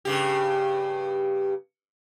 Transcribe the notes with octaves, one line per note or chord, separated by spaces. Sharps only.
G2 C#3 G4